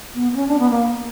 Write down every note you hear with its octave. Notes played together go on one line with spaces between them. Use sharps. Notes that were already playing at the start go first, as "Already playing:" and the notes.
B3
B3
C#4
D4
B3
A#3